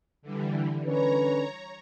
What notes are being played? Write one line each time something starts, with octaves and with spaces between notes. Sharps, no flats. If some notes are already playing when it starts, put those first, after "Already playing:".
D3 E3 G3
D3 C#4 B4 C#5 A#5